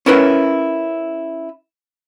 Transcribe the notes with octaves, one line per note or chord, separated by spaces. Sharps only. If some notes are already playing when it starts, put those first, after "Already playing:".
C#4 E4 A#4 B4 C#5